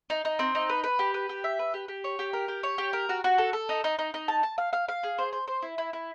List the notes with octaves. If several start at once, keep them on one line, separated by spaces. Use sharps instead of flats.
D#4
D#4
C4
D#4
B4
B4
G4
B4
G4
E5
B4
G4
G4
C#5
G4
A#4
G4
C#5
G4
A#4
F#4
F#4
A4
A4
D#4
D#4
D#4
D#4
A5
A5
F5
F5
F5
G#4
C5
C5
C5
E4
E4
E4